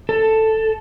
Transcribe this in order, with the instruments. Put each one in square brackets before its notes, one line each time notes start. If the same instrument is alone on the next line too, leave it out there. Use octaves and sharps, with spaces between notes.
[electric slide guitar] A4